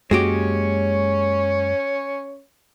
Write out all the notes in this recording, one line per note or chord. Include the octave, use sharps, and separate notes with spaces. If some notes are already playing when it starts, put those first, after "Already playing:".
F#2 G#3 A#3 C#4 F#4 G4 C#5